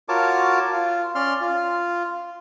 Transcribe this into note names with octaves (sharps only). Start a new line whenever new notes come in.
F4 F#4 A#4 C#5 A5 D6
F4
C#4 D5 C6 F6
F4